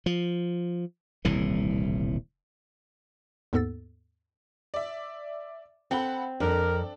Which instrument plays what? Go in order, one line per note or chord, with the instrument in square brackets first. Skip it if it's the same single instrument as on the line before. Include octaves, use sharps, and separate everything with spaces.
[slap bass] F3
D#1 C2 A2 E3
[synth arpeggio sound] D#2 G#2 B3 A4 E6 A6
[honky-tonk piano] D5 E5
[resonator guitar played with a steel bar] C4 [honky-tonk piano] A4 F#5 B5
[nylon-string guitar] F2 [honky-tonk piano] D4 A4 [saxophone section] A#4